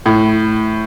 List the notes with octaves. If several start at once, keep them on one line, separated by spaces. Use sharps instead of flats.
A2